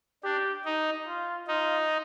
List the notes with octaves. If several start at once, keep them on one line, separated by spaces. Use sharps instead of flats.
D4 G4
D#4
F4
D#4 F4